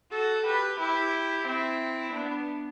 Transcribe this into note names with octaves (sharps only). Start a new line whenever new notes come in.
F#4 A4
G4 B4
E4 G4
C4 E4
B3 D4